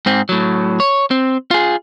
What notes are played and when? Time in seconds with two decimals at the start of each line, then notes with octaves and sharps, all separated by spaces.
0.06 G#2 C4
0.29 A2 F#3
0.80 C#5
1.11 C4
1.51 F4 G#4